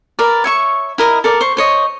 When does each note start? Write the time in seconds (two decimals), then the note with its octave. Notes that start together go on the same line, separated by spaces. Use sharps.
0.19 A#4 B4 D5
0.44 C#5 E5 C#6
0.98 E4 A#4 D#5 D#6
1.24 A4 A#4 D5
1.41 C5 C#6
1.57 C5 C#5 D#5